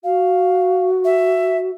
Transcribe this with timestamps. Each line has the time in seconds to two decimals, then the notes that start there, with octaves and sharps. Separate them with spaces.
0.04 F#4 F5
1.05 E5